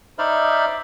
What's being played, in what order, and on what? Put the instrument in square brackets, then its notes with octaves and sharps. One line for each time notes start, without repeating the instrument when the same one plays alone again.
[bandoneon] D#4 C5 D5 E5 B5 F6